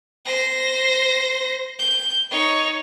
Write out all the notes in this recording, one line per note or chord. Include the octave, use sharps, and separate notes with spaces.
C5 A#6
G6
D#4 C#5